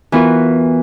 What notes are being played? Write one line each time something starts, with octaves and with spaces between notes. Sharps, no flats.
E3 B3 F4 F#4 A#4